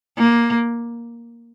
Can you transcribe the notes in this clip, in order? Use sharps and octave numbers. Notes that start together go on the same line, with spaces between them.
A#3